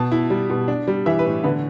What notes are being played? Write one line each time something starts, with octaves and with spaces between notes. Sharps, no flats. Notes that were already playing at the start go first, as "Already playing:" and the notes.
Already playing: B2 A5
E4
G3
B2
D4
G3
E3 E5
B4
A2
D3 B4